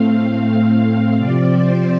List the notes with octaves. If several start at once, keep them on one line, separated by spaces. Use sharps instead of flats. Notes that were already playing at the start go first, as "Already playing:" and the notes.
Already playing: A2 A3 C4 F5
C3 F3 C4 D5
C5